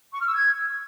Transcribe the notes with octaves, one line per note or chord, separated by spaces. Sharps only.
C#6
F6
E6
G#6